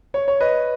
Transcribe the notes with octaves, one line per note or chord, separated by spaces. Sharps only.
C#5
C#5
B4 D#5